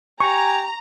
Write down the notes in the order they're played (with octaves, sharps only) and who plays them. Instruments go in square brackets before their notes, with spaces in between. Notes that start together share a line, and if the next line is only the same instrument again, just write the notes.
[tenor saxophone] G4 [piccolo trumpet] G#5 [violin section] A#5 [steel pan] C#6